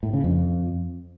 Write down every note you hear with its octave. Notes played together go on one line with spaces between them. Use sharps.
A2
C#3
F2